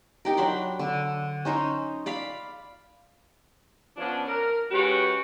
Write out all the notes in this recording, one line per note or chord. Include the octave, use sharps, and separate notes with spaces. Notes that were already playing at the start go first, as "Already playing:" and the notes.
D#4 G4 A#4
F#3 D4 B5 C6
D3
C#4 D#4 C5
D5 F5 B5
F3 B3 C#4 D4
A#4
G#3 C#4 F#4 G4 B4